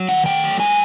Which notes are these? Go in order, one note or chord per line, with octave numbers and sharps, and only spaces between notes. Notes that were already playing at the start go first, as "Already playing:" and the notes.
Already playing: F#3
D#3 F#5
A3 G5
F#3
G#3 G#5